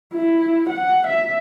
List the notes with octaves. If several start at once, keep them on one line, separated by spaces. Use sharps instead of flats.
E4
F#5
E5